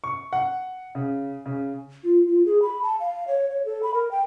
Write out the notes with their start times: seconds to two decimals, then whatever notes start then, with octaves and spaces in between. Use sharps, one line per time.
0.04 C#6
0.33 F#5
0.95 C#3
1.46 C#3
2.04 F4
2.28 F4
2.45 G#4
2.62 B5
2.83 A5
3.00 F5
3.28 C#5
3.50 C#5
3.65 A4
3.83 B5
3.94 A#4
4.11 G5